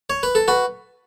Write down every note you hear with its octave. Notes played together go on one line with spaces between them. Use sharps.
C#5
B4
A4
F#4 B4